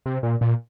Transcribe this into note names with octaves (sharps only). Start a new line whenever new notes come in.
C3
A#2
A#2